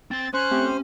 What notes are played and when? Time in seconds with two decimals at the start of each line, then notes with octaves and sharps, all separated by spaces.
0.11 C4 C6 A6
0.33 C#4 C5 F#6
0.51 A3 C4 G4